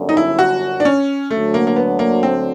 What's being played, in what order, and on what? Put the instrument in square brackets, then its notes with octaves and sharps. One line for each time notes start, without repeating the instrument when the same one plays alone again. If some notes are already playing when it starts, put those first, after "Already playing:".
Already playing: [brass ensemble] G1 F#2 D3
[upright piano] D#4
E4
F#4
D4
C#4
[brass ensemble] D2 D3 F#3 [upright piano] A3
[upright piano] A#3
A#3
B3
A#3
C4